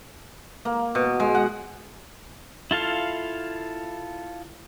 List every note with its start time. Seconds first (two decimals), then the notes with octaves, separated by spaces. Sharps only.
0.65 A#3
0.95 B2
1.20 G#3
1.35 F#5
2.71 E4 F4 A4 F5